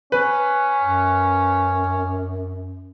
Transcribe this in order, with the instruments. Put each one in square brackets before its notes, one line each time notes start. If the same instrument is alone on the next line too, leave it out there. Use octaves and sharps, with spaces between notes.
[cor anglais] C#4 [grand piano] B4
[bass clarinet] F#2